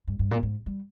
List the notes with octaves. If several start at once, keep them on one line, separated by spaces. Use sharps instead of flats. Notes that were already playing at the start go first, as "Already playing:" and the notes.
G2
G2
A#2
G#2
G3